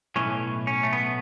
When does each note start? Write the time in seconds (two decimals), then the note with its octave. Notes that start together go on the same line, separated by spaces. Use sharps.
0.16 B1 A2 E3 C#4
0.67 C#4
0.83 A3
0.93 B3